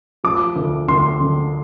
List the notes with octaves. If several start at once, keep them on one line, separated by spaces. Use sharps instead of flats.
F3 D6
D2
D2 C6
D3